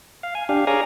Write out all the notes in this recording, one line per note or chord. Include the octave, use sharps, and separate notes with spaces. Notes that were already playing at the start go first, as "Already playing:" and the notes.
F5
G#5
D4 G4 F5
G#4 C#5 D5 F5 G#5 A#5